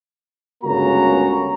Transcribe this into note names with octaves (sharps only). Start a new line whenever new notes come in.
G1 C#2 C#3 A#3 F#4 A#5